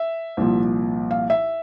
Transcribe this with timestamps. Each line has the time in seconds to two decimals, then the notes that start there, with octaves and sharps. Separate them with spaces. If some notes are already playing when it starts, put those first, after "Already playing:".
Already playing: E5
0.37 C2 A#2 F3
1.11 F5
1.30 E5